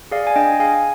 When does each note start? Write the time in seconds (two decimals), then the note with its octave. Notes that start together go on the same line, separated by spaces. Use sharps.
0.11 G#4 D5 F5
0.27 G#5
0.36 D4 D#5 G5
0.60 G#4 F5 G#5